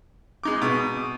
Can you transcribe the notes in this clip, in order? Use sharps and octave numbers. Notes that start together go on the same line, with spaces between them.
G#3 D#4 D6
B2